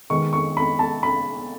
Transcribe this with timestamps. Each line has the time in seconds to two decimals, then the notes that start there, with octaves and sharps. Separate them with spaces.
0.10 D#3 G#3 B3 C#6
0.33 C#6
0.57 B5
0.79 A5
1.03 B5